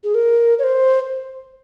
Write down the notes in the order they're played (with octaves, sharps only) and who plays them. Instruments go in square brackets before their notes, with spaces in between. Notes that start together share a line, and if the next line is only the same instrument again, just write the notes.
[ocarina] G#4
A#4
C#5
C5